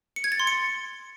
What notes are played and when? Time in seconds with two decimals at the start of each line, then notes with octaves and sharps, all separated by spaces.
0.16 C#7
0.24 G#6
0.32 A6
0.40 C6
0.47 C#7